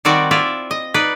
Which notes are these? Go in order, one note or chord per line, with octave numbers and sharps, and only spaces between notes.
D#3 G3 C4 F#4 D5
E4 F4 D5 E5
D#5
D#4 B4 D5